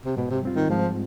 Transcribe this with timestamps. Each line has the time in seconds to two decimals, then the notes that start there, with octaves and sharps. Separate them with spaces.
0.05 C3
0.16 G#2 B2
0.30 C3
0.43 G3 C4 F4
0.56 D#3
0.70 G#2 F3